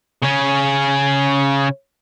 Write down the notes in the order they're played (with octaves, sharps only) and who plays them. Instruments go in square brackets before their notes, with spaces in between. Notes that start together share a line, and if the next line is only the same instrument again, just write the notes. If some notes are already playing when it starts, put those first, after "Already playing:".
[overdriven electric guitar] C#3 C#4